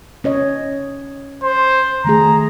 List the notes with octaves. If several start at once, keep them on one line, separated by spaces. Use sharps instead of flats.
C#4 C#5 D#5
C5
D#3 A3 G#4 A#5